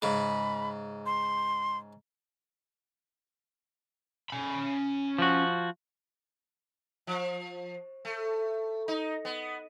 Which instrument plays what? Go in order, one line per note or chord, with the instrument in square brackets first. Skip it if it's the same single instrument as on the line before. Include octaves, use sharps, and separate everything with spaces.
[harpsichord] G#2 C#3 [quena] B5
[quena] C6
[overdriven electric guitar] C#4 B5
[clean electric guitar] F3 F#4
[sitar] F3
A3
D#4
B3